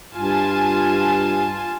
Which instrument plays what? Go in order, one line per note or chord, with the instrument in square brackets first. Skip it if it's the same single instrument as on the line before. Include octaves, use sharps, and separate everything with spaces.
[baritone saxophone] G2 [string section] F4 G#5 A5